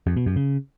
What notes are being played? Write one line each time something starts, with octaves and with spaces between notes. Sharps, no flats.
F2
B2
F#2
C#3